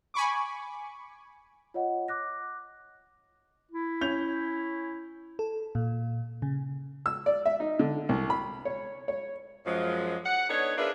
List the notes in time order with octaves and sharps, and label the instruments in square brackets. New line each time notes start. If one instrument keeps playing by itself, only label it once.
[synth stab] G#5 B5 C#6 D6
[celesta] F4 C#5 D#5 F#5
D6 F#6 A#6
[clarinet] E4
[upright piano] C#4 G6 F7
[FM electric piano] A4
A#2
C#3
[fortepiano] E6
D5
E5
D#4
D3
C2
B5
C#5
C#5
[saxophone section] F#2 F3 G#3
F#5
B3 D4 D#4 A4 C#5
D4 F4 G#4 A#4 B4 E5